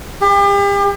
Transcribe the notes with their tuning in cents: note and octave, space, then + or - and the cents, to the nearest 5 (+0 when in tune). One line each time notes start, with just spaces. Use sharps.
G4 +40